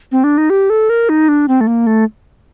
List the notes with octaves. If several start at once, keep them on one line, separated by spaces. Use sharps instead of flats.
C4
D4
D#4
G4
A4
A#4
D#4
D4
C4
A3
A#3
A3